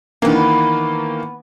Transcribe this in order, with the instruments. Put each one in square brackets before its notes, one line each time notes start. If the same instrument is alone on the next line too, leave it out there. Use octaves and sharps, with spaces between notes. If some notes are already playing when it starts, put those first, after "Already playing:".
[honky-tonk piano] D#3 E3 A#3 [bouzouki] B3 B4